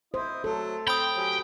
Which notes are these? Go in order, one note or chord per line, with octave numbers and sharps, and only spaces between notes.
E4 C5 D#5
F#3 A3 A4
C4 G5 B5 D#6
F#3 C#4 G4